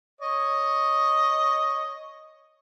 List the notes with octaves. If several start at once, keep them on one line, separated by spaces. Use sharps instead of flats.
C#5 D#5